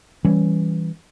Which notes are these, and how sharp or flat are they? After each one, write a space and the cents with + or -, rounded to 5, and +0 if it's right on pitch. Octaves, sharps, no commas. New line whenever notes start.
E3 +0 G3 +0 C#4 +0